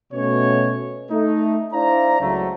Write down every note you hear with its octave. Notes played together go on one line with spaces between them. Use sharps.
B2 A3 C#4 C#5
A3 D#4
D4 E4 C5 D5 F5 A#5
C#2 F#3 A3